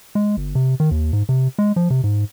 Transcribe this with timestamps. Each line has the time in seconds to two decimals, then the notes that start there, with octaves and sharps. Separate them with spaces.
0.15 G#3
0.37 G1
0.55 C3
0.80 D#3
0.91 D#2
1.13 G#2
1.29 C3
1.59 G#3
1.76 F3
1.90 C3
2.04 G#2